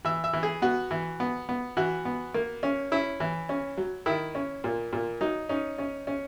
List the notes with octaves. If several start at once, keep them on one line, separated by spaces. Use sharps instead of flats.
E3 E5
E5
E3
G#4
B3 F#4
E3
B3
B3
E3 F#4
B3
A#3
C#4
C#4 E4
E3
C#4
F#3
D#3 E4
C#4
A#2
A#2
F#3 D#4
C#4 D#4
C#4
C#4